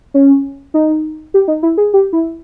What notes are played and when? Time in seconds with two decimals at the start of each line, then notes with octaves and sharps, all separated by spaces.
0.14 C#4
0.74 D#4
1.34 G4
1.48 D#4
1.63 E4
1.78 G#4
1.94 G4
2.13 E4